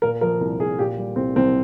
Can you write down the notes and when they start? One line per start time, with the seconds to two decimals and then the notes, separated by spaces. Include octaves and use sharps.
0.02 A#2 A#4
0.21 F3 A#4
0.41 C2
0.60 C2 G#4
0.79 A#2 G4
0.98 G3
1.16 C2 C4
1.36 C2 C4